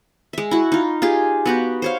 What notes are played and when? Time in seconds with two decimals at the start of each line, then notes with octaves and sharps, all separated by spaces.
0.33 G#3 E5
0.51 E4 F#4
0.72 D#4 F4
1.02 F4 G4 G#4
1.46 B3 F#4 G4
1.82 C5 C#5 F5